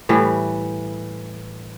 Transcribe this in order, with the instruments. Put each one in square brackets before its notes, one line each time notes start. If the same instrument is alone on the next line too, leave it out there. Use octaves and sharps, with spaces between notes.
[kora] A2 E3 G3